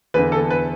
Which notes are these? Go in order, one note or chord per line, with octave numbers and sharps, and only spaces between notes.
E2 D3 B4
A4
B4